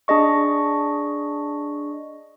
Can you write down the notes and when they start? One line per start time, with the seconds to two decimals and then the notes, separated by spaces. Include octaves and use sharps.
0.08 D4 G#4 D#5 C#6